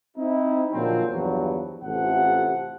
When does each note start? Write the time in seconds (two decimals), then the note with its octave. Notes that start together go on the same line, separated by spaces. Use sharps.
0.17 C4 D#4 E4
0.73 A#2 D3 F3 F#3 G#3 C4
1.10 E2 G2 F3 F#3
1.84 A1 C3 F4 A4 F#5